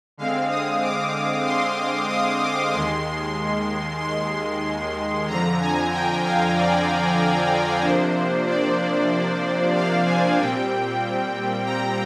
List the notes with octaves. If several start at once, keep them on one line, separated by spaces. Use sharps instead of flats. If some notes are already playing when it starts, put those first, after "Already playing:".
D3 G#3 C4 F5
D#6
D6
C6
D#6
D6
D#2 D#3 G#3 C6
C6
F2 D3 F3 A#5
G#5
G5
F5
D5
C3 F3 A#3 D4 C5
D5
F5
G#5
A#2 G3 C4 G5
A#5